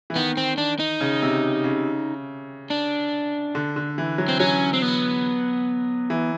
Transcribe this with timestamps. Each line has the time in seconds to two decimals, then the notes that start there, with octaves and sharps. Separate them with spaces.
0.10 E3
0.16 D#3 B3
0.37 C4
0.58 D4
0.79 D#4
1.01 C#3
1.22 C3
1.64 C#3
2.70 D4
3.55 D3
3.76 D3
3.98 E3
4.18 F#3
4.28 C4
4.40 F#3 C#4
4.73 C4
4.82 B3
6.10 E3